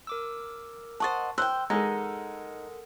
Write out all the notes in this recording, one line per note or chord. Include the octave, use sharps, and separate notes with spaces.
A#4 D6 E6
C5 D#5 F#5 A5 C#6 A6
C5 G5 E6 F#6
G#3 D#4 A4 A#4 F#5